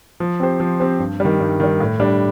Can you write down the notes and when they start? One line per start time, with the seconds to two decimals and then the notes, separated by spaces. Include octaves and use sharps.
0.20 F3
0.40 C4 G4 C5
0.60 F3
0.80 C4 G4 C5
0.99 G2
1.20 D#3 G3
1.40 G2
1.60 D#3 G3
1.80 A2
2.00 G3 D4